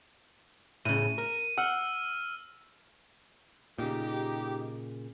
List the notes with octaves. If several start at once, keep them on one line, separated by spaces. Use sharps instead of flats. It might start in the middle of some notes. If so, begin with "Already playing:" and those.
A2 C#3 D#7
A#4
F#5 E6 F6
A#2 C#3 D#4 G4